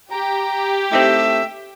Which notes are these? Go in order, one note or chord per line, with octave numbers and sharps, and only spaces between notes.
G4 A#5
A3 C4 D#4 E4 E5